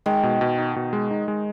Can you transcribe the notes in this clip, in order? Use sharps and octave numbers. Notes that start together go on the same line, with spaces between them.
D#3 G#3
B2
B2
D#4
B2
G#3
D#4
G#3